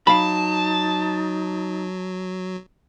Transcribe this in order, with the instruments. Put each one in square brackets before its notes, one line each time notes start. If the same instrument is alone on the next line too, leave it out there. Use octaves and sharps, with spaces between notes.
[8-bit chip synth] F#3 [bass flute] D#4 [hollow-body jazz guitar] F5 B5 [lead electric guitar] A5